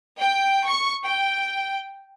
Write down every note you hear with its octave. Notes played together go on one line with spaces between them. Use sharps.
G5
C#6
G5